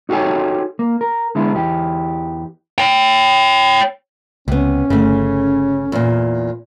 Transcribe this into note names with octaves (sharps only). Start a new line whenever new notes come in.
D#4 F#4 G4 A4 C#5 G#5
A#3
A#4
D3 G#3 B3 E4
E2 E3 G4
C#5 G5
C#2 C3 B3 C#4
G1 C#3 A3
E2 A#2